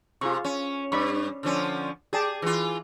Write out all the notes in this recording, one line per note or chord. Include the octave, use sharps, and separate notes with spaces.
C3 F4 G#4 C#6
C#4
G2 D5 B5 C#6
D3 F3 C#4
G4 G#4 D5 A5
E3 F4